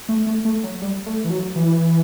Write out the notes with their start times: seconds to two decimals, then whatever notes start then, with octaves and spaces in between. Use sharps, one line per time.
0.09 A3
0.27 A3
0.45 A3
0.63 F#3
0.82 G3
1.06 A3
1.24 E3
1.30 F#3
1.55 E3